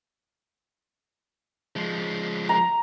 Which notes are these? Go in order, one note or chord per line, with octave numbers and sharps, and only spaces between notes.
F3 G#3
A#5